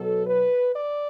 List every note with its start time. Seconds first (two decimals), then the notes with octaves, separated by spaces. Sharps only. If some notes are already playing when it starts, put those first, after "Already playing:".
Already playing: B2 F#3 A4
0.26 B4
0.74 D5